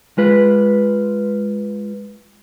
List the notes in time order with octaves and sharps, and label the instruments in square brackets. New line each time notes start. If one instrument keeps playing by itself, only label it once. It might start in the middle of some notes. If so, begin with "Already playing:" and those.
[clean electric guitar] G#3 F4 B4